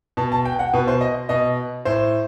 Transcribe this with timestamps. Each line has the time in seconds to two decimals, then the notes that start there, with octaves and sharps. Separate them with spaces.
0.17 B2 A5
0.32 A5
0.45 G5
0.59 F#5
0.73 B2 B4
0.88 C5
1.01 D#5
1.29 B2 D#5
1.85 A2 C5